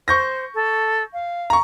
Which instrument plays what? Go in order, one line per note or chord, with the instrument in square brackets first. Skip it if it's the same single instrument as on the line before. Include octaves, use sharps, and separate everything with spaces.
[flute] C5 [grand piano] C#6 G6 A#6
[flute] A4
F5
[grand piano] A#5 C#6